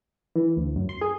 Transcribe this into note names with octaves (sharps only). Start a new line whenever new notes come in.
E3
D2
F#2
C6
G#4